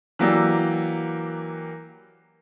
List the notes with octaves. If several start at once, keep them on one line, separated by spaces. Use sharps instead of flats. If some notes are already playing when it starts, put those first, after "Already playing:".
E3 F#3 A#3 G4 D5 E6